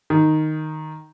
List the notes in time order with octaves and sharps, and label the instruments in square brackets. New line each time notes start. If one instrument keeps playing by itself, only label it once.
[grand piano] D#3